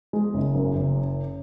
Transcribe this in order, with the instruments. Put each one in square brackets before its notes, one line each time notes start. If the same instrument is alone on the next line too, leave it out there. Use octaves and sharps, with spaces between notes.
[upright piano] G#3
F#1
F#2
F#1